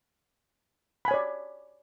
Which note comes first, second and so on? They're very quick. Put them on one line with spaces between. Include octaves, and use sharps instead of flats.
B5 G#5 C#5 D5